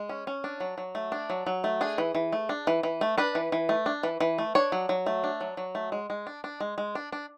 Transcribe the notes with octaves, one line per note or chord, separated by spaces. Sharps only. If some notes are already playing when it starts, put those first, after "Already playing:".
Already playing: G#3
C#4
C#4
D4
F#3
F#3
A3
D4
F#3
F#3
A3
D4 G#4
E3
E3
A3
D4
E3
E3
A3
D4 B4
E3
E3
A3
D4
E3
E3
A3
D4 C#5
F#3
F#3
A3
D4
F#3
F#3
A3
G#3
G#3
D4
D4
G#3
G#3
D4
D4